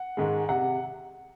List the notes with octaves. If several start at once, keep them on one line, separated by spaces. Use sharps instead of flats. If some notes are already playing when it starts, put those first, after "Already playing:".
Already playing: F#5
G#2 D#3 G#3
C3 F#5